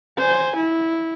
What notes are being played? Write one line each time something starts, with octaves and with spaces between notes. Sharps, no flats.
C5 G#5
E4